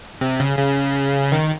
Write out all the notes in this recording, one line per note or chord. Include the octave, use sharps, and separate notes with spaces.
C3
C#3
C#3
D#3